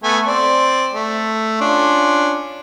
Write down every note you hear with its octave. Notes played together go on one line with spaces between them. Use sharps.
A3 B3 G#5
C4 D5
A3
C#4 D4 F4